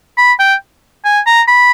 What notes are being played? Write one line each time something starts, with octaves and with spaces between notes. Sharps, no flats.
B5
G5
G#5
A#5
B5